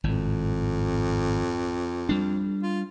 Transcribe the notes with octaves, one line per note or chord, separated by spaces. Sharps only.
G#1 F2 A2
G3 D4
F4